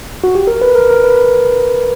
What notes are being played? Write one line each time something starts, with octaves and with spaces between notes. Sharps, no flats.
F#4
G4
A#4
B4
A#4
A#4
B4